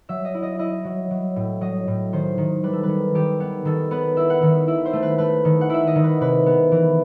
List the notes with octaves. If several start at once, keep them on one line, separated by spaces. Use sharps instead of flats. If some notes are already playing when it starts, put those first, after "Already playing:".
F#3 E5
D#5
E4
D#5
E4 D#5
F#3
F#3
A2
F#3 D#5
A2
D#3 C5
D#3
G3 B4
A4
B4
D#3
D#3 G4
B3
D#3 A4
B3 B4
E4 E5
F#5
D#3 E5
E4 E5
C5
A3
B4
A3 B4
D#3
F#5
E4 E5
D#5
D#3
B4
C3 B4
B3
E3